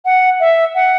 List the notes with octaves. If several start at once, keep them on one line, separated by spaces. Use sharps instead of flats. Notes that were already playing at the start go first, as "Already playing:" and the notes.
F#5
E5
F#5